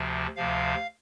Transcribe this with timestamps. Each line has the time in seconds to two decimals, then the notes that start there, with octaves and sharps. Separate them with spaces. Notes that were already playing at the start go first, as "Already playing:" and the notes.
Already playing: D2 C3 F3
0.36 D2 C3 F3 F5